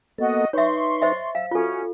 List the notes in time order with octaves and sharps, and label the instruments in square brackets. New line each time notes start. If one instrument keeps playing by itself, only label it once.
[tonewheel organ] A#3 B3 A4 [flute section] F#4 D#5
[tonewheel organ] D#4 B4 [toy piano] C#5 E5 [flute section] C6 C#6
[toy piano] C5 D#5 E5
[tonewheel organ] E5 [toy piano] F5
[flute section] C#4 [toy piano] F4 A4 [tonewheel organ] F#4